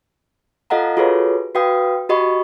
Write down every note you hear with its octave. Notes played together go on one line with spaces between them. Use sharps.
F4 A4 D#5 F5 F#5 A#5
F4 F#4 G#4 A4 B4 C#5
F#4 B4 F5 G5 D#6
F#4 G4 D#5 B5 C#6